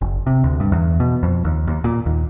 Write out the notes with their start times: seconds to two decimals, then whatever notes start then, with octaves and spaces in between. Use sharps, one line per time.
0.01 F#1
0.27 C3
0.44 D2
0.60 G2
0.72 E2
1.00 B2
1.23 F2
1.45 D#2
1.67 D#2
1.84 A#2
2.06 D#2